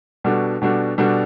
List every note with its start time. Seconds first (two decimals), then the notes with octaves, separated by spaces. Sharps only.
0.24 B2 G3 D4 F#4 A4
0.62 B2 G3 D4 F#4 A4
0.98 B2 G3 D4 F#4 A4